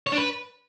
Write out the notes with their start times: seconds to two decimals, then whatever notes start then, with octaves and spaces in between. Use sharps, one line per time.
0.07 C#5
0.12 D4
0.18 B4